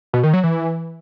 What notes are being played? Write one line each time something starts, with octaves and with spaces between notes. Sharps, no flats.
B2
D#3
F#3
E3